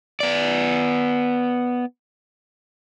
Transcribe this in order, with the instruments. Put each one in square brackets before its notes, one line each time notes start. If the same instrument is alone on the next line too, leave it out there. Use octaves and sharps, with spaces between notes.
[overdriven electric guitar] B3 D5